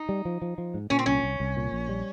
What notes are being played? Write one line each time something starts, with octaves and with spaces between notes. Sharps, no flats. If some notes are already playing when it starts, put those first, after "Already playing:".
Already playing: D#4
G3
F3
F3
F3
G#2
A#2 C#4
C4
C2 C#4
C2
C2
A#2
A#1
G3